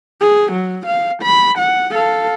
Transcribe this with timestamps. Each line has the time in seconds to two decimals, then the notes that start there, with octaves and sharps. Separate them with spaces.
0.21 G#4
0.52 F#3
0.86 F5
1.23 B5
1.59 F#5
1.92 A4 F5